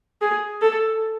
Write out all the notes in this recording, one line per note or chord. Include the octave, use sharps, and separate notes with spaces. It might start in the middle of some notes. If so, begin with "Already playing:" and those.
G#4
A4